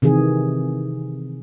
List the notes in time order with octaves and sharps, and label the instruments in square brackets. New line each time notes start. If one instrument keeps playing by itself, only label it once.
[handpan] C3 D#3 E3 G#4